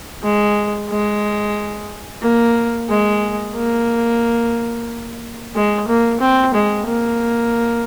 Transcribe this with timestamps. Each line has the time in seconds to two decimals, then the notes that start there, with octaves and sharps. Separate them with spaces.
0.23 G#3
0.90 G#3
2.22 A#3
2.89 G#3
3.56 A#3
5.55 G#3
5.88 A#3
6.20 C4
6.54 G#3
6.88 A#3